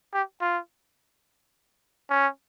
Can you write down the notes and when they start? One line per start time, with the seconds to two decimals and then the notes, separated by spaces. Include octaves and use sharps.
0.13 G4
0.41 F4
2.10 C#4